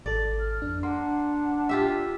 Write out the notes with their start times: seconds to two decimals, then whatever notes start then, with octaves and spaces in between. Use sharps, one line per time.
0.06 G#1 A4 D5
0.40 F6
0.62 F2 D4
0.83 A#3 D4 F#5 C6
1.69 F4 G4 E5